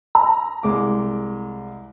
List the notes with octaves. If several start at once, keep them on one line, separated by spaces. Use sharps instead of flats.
A#5
C2 G#3 D6